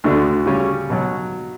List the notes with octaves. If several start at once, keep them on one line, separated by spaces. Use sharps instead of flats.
D2 D3 A3 D4 F#4
C#3 G3 C#4
B2 F#3